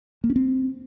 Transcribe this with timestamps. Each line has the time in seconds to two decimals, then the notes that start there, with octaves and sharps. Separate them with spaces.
0.24 A#3
0.30 C#4
0.36 C4